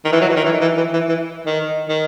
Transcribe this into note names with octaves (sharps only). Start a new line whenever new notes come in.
D#3
E3
F#3
E3
D#3
E3
D#3
E3
E3
E3
E3
D#3
D#3